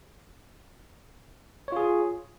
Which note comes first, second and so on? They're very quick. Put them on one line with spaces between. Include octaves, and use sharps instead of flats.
C#5 F4 G#4